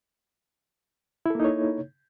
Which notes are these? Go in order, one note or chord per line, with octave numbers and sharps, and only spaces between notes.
A#3 D#4 E4 A4 C#5